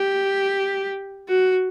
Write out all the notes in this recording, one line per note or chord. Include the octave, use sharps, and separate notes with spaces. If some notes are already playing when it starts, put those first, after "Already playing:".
Already playing: G4
F#4